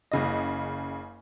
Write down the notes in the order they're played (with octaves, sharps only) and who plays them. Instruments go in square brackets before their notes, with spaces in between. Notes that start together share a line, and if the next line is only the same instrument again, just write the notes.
[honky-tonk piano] F#1 C#3 D#5